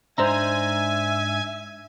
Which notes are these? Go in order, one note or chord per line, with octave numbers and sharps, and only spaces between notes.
G#2 D4 D#4 C5 E5 G#5 A#5